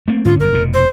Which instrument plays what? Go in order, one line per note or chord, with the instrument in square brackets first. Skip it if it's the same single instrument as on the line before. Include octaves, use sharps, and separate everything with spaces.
[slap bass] A3 A#3 C4
[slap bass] G#2 D3 C#4 [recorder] F4
[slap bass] G1 F#2 [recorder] A#4
[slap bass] F1 F2 B2
[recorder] C5